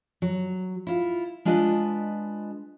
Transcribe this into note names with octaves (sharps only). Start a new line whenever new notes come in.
F#3
E4 F4
G#3 D4 F4 B4 D#5